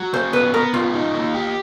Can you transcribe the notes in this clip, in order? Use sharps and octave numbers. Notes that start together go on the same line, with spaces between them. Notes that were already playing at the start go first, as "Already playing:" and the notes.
Already playing: F#3
C#3 C5
B3 B4
B3 A#4
C#3 F4
D#4
A#3
G4